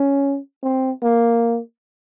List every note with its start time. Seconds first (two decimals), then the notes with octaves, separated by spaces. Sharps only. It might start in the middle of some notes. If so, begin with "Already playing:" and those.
Already playing: C#4
0.63 C4
1.03 A#3